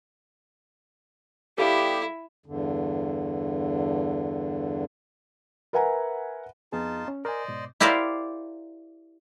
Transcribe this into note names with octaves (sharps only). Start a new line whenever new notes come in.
G3 B3 E4 G4 A4 F5 G5
E2 G2 D3
A#4 B4 E5 F#5 G#5 A#5
F2 B3 D#4 F4 G#4 A5
C#4
A#4 C5 D5 D#5 G#5
G#2 B2
E4 G4 A#4 C5 D5 F5